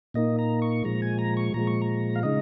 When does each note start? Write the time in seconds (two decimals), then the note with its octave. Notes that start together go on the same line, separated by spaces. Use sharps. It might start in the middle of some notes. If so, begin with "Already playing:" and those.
0.14 A#2 A#3 D#4 D#5
0.39 A#5
0.62 C#6
0.84 A#2 F3 G#3 A#5
1.02 G#5
1.19 A#5
1.37 C#6
1.54 A#2 F3 G#3 A#5
1.67 C#6
1.82 A#5
2.16 F5
2.23 C#3 G#3 D#4 D#5